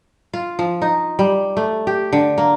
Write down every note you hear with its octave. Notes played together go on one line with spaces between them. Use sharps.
F4
F3
D#4
G3
A3
G4
D3
A#3